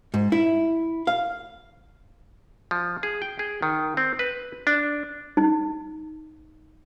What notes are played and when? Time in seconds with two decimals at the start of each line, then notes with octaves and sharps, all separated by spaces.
0.14 G#2
0.32 E4
1.07 F5
2.71 F3
3.03 G#4
3.22 G5
3.39 G#4
3.62 D#3
3.97 C4
4.19 B4
4.67 D4
5.37 D#4